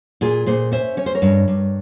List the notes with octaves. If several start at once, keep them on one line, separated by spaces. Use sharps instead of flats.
A#2 F4 G#4
A#2 G#4 C5
C#4 C5 E5
C#4 C#5
C5
A#4 C#5
G2
G2